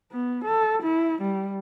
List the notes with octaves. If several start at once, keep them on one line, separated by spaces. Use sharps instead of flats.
B3
A4
E4
G3